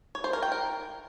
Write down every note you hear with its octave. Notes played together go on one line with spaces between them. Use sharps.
C#5
C5
A#4
G5
A#4